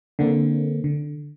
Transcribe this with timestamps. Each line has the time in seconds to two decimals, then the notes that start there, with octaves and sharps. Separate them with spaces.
0.19 D3 A#3 C4
0.84 D3